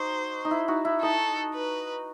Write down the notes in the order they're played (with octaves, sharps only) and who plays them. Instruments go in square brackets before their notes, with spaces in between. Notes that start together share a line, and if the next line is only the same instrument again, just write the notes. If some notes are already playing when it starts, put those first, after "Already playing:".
Already playing: [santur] D#4 F#4 [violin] C5
[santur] D#4
E4
D#4 F#4
E4
[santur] D#4 [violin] A4
[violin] B4